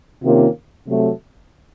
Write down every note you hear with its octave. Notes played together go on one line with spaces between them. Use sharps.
C3 D#3 A#3 C#4 F4
C3 F#3 A3